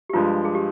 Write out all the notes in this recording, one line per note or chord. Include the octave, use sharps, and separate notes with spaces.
G4
G2 F3 G#3 F4
G#4
G4